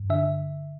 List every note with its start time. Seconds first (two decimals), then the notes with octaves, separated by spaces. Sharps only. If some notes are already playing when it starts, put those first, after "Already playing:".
Already playing: G2
0.10 D3 E5